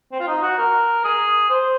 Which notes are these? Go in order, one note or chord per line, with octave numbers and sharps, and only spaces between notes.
C4
F4
D#4
F#4
A#4
G#4
C5